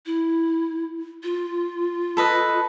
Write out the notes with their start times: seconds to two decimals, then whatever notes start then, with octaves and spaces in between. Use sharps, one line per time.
0.06 E4
1.23 F4
2.17 A4 B4 D#5